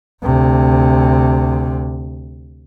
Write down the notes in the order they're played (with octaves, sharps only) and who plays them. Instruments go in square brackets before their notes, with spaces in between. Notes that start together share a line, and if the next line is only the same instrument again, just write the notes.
[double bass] D2 C3